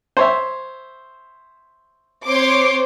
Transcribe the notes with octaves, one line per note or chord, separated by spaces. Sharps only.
C5 C#5 E5
C4 C5 C#5 C6 D6